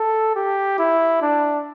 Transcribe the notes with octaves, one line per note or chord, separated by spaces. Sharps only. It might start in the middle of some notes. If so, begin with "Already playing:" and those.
Already playing: A4
G4
E4
D4